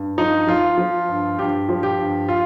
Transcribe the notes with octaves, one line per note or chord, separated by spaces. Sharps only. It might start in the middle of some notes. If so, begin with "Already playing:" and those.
Already playing: G2
F3 D#4
F3 F4
F3
G2
G2 G4
F3
G4
G2
F4